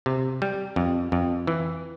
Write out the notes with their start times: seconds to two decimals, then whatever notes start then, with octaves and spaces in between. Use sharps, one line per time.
0.06 C3
0.42 G3
0.76 F2
1.12 F2
1.47 E3